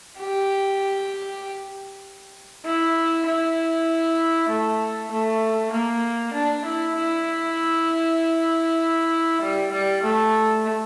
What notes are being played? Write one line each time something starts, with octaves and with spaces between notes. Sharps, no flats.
G4
E4
E4
A3
A3
A#3
D4
E4
E4
G3
G3
A3